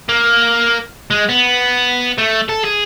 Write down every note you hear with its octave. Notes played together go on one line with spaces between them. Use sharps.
A#3
G#3
B3
A3
A4
G#4